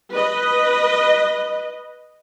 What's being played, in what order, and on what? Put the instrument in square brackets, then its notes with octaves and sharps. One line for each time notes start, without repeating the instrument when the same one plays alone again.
[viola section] B4 D#5